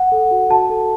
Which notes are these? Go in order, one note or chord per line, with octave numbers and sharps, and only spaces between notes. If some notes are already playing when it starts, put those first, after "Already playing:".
Already playing: F#5
A4
F#4
F#4 A5
A4